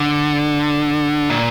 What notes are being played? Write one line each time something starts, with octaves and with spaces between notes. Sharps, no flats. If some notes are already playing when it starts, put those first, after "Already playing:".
Already playing: D3
A#2